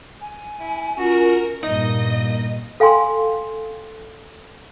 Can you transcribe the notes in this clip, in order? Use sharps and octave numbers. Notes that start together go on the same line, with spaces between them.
G#5
E4
C#4 F4 F#4 A#4
G2 A#2 A#3 D#4 D#5
A4 F5 G5 G#5 C6